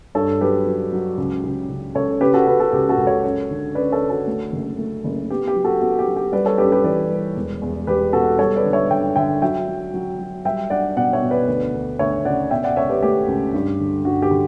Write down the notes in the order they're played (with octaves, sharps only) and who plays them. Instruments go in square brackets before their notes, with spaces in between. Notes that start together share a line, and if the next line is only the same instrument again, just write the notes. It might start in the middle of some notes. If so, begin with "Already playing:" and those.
[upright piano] G2 A4 C#5
F#3 G4 B4
F#3
F#3
C#2
C#3
C#3
C#2 A4 C#5
C#3 G4 B4
F#4 A4
C#3 G4 B4
F#4 A4
C#2 G4
F#4 A4
C#2
A4 C#5
F#2
D3
C#4 B4 D5
A4 C#5
D3
F#4 A4
A3
F#1
A3
F#1
B3 G4
G4
F#3
F#4 A4
B3 F#4
G4
F#3
G4
G3 B4 D5
A4 C#5
F#2 G4 B4
G4 B4
E3 B4 D5
G3
E1
E2
E1 G4 B4
B2 F#4 A4
G3 A4 C#5
B4 D5
D3
C#5 E5
D3 E5 G5
D3 E5 G5
F#3 E5 G5
F#3
F#3
F#3
G3 E5 G5
D4 D5 F#5
B2 D5 F#5
C#5 E5
B2
B4 D5
D2
D2
D2 C#5 E5
C#3 D5 F#5
B2 E5 G5
D5 F#5
C#2 C#5 E5
G4 B4
A3 G4
C#2
G2
D3
G2 F#4
G4
D3